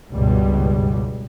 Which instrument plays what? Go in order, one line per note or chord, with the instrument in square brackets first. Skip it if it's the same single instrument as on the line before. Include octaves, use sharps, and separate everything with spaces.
[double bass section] C#2 G2 B2 G3